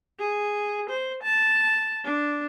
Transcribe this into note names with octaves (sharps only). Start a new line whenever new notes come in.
G#4
C5
A5
D4